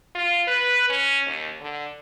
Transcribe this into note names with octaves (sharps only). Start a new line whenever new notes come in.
F4
B4
C#4
D#2
D3